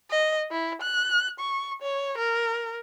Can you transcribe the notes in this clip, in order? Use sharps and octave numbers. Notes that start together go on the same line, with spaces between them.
D#5
E4
F#6
C#6
C#5
A#4